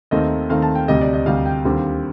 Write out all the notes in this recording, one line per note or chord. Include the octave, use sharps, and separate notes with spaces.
D#2 D#3 A3 C4 D#5
D#2 D#3 A3 C4 F5
A5
G5
D2 C3 G3 D#5
D5
D#5
D2 C3 G3 F5
G5
D#2 D3 G3 C4